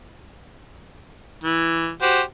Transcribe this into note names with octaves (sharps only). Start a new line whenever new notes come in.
E3
F#4 G4 C5